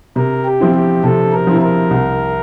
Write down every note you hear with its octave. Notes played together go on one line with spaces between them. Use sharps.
C3 A#4
G4
F3 C4 E4
G4
C3 A4
A#4
F3 C4 E4
A#4
C2